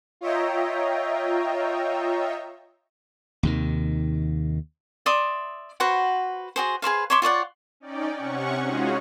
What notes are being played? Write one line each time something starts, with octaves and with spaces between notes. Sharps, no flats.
F4 C#5 D#5 E5 G5 A#5
D#2 C3 D#3
D5 E5 C6 D#6
F#4 B4 C5 F#5
F#4 G#4 C5
G#4 B4 C5 F5
C#5 E5 C6 D6
F4 C#5 D5 F#5
C#4 D#4 D5 G5
C3 C#4 F#5 C#6
G#3 C#4 D#4 F4 F#4 G#4